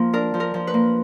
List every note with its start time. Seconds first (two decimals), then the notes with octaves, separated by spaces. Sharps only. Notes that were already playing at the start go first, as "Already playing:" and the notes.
Already playing: F3 A#3
0.13 D4 A#4
0.34 F3
0.40 A#4
0.54 F3
0.67 B4
0.74 A#3